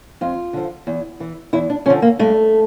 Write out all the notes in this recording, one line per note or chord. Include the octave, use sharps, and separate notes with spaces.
F2 F4
D3 F3
E2
E3
E2 E4
D4
D3 F3 C#4
A#3
G2 A3